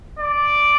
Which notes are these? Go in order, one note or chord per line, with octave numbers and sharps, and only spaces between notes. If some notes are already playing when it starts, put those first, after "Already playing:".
D5